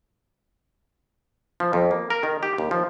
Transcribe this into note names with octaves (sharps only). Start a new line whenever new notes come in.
F3
F2
A#3
A#4
D#3
G4
D#2
F3